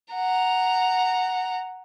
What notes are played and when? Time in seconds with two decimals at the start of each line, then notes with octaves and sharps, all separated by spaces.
0.14 F#5 A#5